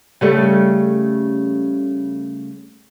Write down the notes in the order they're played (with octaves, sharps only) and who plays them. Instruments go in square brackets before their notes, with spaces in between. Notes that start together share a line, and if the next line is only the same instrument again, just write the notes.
[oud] C#3 G3 A3